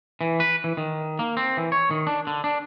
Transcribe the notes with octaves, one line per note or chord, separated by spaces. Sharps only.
E3
B4
E3
D#3
A#3
C4
E3
C#5
D#3
D4
D3
D4